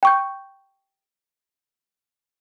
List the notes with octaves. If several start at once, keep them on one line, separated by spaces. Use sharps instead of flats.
G5 C#6 G6